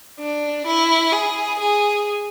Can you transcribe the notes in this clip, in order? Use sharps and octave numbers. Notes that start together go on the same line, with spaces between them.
D4
E4
G#4
G#4